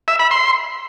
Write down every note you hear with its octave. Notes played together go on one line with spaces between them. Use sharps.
E5
B5
C6